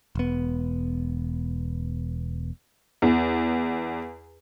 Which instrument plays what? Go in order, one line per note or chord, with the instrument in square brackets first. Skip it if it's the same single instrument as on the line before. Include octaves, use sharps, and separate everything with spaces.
[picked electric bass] E1 B3
[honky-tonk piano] E2